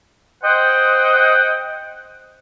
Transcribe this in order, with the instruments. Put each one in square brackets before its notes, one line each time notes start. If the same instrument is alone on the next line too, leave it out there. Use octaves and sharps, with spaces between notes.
[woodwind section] C5 D#5 F#5 G5